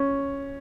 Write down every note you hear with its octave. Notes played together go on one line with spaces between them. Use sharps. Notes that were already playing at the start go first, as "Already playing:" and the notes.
Already playing: C#4